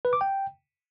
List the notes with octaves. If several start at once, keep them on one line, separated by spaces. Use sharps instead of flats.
B4
D6
G5